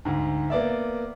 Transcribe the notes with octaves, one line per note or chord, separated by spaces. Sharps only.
D2 G#2
A#3 B3 D5 E5